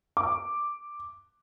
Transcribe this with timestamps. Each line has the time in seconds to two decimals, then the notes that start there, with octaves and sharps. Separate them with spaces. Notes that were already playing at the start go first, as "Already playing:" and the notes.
0.17 D6